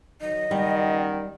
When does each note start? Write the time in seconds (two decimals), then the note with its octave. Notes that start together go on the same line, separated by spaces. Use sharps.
0.21 D#3 F#3 D#5
0.51 F#1 D#3 G3 F#5